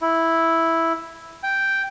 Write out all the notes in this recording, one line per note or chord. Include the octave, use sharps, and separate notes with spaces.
E4
G5